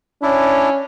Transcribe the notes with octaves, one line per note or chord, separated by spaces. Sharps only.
C#4 D4 E4